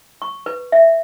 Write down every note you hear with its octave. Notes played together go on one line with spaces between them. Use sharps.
C#6
B4
E5